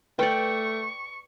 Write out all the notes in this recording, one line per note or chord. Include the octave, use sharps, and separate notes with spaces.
A3 B4 D5 G5 C#6